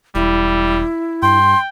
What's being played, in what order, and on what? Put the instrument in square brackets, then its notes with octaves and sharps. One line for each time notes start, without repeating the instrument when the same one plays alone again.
[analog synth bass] E1 [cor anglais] G3 [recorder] E4
[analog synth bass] G2 [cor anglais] G5 [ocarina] C6